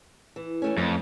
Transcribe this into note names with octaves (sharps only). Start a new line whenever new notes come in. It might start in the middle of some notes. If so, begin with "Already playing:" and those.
E3
E3 A3 C#4
F2 C#4